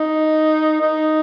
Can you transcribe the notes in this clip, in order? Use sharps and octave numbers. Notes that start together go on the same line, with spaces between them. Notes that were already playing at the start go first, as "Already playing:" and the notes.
Already playing: D#4
D#4